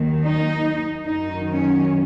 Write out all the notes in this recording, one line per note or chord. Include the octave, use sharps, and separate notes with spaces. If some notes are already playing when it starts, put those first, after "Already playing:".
Already playing: D#2 D#3 F#3
D#4
F#2 D#3 F#3 D#4
C#4